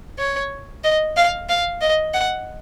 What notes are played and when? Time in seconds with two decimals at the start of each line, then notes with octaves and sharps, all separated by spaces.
0.19 C#5
0.84 D#5
1.17 F5
1.49 F5
1.81 D#5
2.14 F#5